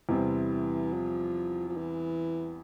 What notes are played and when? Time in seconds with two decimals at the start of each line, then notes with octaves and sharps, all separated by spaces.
0.09 E2 C3 E3 G3 C4
0.93 F3
1.69 F3
1.77 E3